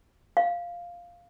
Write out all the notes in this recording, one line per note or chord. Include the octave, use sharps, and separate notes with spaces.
F5